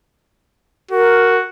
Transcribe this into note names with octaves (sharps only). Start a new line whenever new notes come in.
F#4 A#4